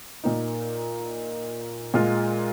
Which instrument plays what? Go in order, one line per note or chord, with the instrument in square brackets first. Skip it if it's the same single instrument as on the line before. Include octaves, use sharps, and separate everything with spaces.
[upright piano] A#2 A#3 D#4
A#2 G#3 F4